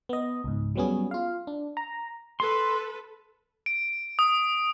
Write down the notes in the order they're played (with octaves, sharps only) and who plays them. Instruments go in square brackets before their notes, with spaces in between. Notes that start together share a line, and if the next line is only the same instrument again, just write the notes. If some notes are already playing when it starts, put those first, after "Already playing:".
[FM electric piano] B3 D#5
C#2 G#2
F#3 G3 B3 C#4 G#4
F4 F5
D4
A#5
[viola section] A4 B4 [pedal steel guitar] C6
[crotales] D7
D#6